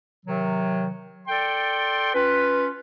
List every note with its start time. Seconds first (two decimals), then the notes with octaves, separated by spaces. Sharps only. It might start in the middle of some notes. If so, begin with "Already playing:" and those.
0.24 C3 D#3 F#3
1.27 A4 D5 G5 C6
2.14 C#4 F4 B4